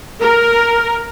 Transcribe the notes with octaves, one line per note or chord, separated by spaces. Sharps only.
A#4